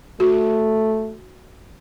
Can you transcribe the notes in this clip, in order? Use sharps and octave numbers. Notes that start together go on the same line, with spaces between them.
A3 F#4